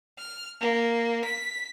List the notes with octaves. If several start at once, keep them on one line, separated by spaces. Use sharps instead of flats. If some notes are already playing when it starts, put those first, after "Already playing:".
F6
A#3
B6